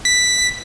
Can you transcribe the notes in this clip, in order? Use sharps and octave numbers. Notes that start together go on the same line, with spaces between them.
B6